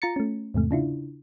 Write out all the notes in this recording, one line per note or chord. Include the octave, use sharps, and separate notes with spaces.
F4 A#5 A6 C#7
A3 C#4
E2 G#2 C3 A3
C#3 D4 E4 F4